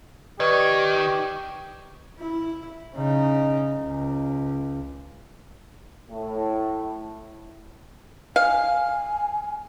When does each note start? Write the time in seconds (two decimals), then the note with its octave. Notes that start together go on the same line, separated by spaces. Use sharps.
0.40 D#3 G4 B4 D5 D#5 C#6 G#6
2.20 E4
2.95 C#3 D#4
3.78 C#2
6.11 A2
8.36 F5 G#5